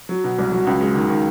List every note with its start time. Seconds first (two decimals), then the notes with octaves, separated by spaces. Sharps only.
0.09 F#3
0.24 B2
0.39 C2
0.52 F#3
0.67 C#2
0.81 G#3
0.95 D#3
1.10 D#3